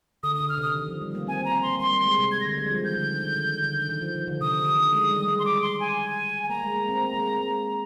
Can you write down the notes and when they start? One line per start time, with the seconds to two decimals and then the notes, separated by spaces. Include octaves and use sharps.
0.23 D3 D#6
0.36 D3 D#6
0.49 F6
0.58 C3
0.62 D#6
0.75 D#3
0.88 F3
1.01 G3
1.15 A#3
1.27 C4 G#5
1.40 A#3
1.45 A#5
1.53 C4
1.62 A#3 C6
1.80 G3 C6
1.93 G3
2.06 G#3
2.18 C3
2.31 C3 G#6
2.41 A#6
2.45 D3
2.50 G#6
2.58 G#3
2.65 G3
2.70 F3
2.84 D#3 G6
2.97 D3
3.23 D3
3.36 D#3
3.62 D3
3.89 D#3
4.02 F3
4.14 F3
4.28 D3
4.41 C3 D#6
4.59 D3
4.76 D#3
4.93 G#3
5.10 G3
5.28 G#3
5.39 C6
5.45 D6
5.62 C6
5.80 G#5
6.43 G#5
6.49 A#3 A#5
6.63 G#3
6.76 A#3
6.89 C4
7.02 A#3
7.13 G#3
7.19 A#3
7.37 G#3